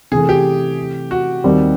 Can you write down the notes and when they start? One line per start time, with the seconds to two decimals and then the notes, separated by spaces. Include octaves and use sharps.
0.11 C3 E3 A3 G#4
0.29 G4
1.11 F#4
1.44 D#2 D#3 G3 C4